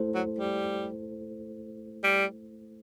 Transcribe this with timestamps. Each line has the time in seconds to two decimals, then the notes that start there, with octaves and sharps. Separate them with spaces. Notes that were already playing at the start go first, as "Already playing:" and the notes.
Already playing: A3 E4 A4 C5
0.15 F#3
0.38 G3
2.04 G3